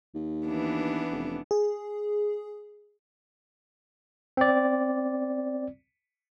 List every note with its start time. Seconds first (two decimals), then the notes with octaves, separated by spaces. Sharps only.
0.14 D#2
0.46 E3 B3 D4
1.11 F1
1.51 G#4
4.37 C4 D5